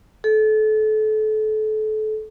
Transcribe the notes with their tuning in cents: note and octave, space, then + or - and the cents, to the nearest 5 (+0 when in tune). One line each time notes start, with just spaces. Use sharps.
A4 -30